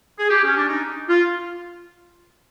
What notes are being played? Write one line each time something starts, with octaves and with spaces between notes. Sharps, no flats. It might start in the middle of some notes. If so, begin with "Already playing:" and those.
G#4
G4
C#4
D4
D#4
F4